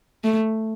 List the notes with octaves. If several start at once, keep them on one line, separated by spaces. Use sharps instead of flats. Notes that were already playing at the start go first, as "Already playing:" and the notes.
A3